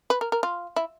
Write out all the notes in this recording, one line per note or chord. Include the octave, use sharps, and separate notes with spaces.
B4
A#4
A#4
F4
E4